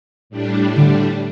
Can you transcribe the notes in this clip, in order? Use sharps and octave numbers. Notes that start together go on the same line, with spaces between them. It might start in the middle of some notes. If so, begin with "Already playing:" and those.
A2 G3 D4
D3